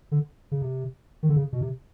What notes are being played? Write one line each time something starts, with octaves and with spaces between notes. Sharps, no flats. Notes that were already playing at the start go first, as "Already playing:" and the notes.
D3
C#3
C3
D#3
D3
C#3
B2
C3